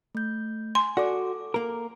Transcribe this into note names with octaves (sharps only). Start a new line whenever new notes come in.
A3 G6
G#5 C6
F#4 A4 D5 D6
A#3 A#4